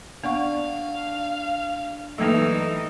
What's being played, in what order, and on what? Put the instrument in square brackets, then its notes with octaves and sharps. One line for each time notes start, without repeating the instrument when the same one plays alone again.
[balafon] B3 F#5 C#6 [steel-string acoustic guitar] D4 [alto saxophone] F5
[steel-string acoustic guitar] G2 A3 [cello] E3 D#4 [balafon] F#3 A#3 A4